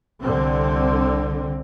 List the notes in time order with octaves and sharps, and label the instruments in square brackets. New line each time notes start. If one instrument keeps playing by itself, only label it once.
[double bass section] C2 D3 C4